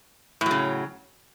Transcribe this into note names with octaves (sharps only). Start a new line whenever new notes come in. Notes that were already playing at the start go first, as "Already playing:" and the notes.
A2 C#3 F#3